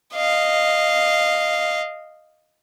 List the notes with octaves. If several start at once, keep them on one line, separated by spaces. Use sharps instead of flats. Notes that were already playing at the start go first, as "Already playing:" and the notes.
D#5 F5